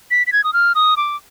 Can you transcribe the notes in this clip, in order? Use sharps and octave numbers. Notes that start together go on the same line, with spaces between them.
B6
B6
G#6
D#6
F6
D#6
D6